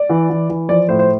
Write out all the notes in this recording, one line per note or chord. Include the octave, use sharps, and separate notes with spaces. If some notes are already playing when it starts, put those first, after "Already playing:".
Already playing: D5
E3
E3
E3
F3 D5
A2 C5
C5